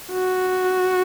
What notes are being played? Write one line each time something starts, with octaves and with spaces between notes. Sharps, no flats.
F#4